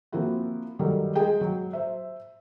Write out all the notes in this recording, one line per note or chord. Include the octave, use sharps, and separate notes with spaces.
F3 A#3 C4 E4 F#4
D3 D#3 F#3 G3 A#4
G#3 G#4 D#5 G5
F#3
C5 E5